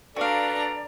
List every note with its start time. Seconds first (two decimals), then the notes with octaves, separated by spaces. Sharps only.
0.16 D4 F#4 A4 B4 D5 F5 A#5